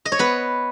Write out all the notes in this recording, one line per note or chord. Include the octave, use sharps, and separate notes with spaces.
D#5
C#5
B3 B4